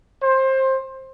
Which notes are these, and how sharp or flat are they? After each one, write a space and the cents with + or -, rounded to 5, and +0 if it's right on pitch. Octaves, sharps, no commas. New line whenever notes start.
C5 +20